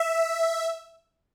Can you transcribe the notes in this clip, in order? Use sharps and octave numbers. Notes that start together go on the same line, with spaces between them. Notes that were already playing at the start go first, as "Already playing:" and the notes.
Already playing: E5